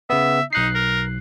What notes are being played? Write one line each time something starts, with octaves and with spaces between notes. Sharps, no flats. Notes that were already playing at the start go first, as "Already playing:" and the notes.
C#3 B3 E5
B1 D#4 F#6 C7
A#4